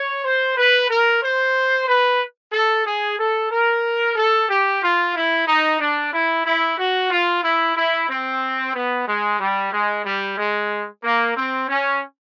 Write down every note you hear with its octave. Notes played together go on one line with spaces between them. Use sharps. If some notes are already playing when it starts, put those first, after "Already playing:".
Already playing: C#5
C5
B4
A#4
C5
B4
A4
G#4
A4
A#4
A4
G4
F4
E4
D#4
D4
E4
E4
F#4
F4
E4
E4
C4
B3
G#3
G3
G#3
G3
G#3
A#3
C4
C#4